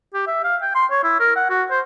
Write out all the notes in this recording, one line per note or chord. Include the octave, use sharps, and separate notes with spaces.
G4
E5
F5
G5
C6
C#5
E4
A#4
F#5
F#4
C5